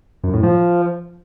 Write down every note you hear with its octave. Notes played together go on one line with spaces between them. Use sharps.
F#2
A2
F3